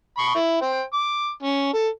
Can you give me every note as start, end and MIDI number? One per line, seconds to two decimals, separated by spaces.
0.19 0.34 83
0.19 0.34 85
0.35 0.58 64
0.62 0.82 72
0.62 0.82 79
0.93 1.30 86
1.43 1.73 61
1.74 1.88 69